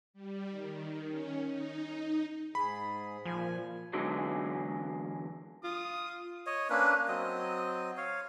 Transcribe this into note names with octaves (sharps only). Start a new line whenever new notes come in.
G3
D#3
C#4
D#4
G#2 G#4 B5
A#2 F3 G#5
E2 D3 E3 F#3 G#3
F4 D#6
C#5 D#5
A#3 C#4 D4 B4
F#3 C4 D#5
C#5 F5